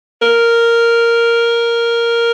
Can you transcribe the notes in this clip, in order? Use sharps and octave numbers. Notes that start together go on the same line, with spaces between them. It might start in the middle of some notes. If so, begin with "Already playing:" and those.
A#4